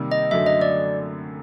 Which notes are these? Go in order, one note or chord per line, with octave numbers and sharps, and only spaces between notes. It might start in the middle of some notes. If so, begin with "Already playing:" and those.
Already playing: C3 D#3 G3 A#3
D#5
F#2 D3 F#3 A3 E5
D#5
D5